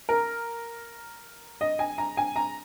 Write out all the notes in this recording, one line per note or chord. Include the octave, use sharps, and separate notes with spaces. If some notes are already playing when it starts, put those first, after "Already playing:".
A#4
D#5
G#5
A#5
G#5
A#5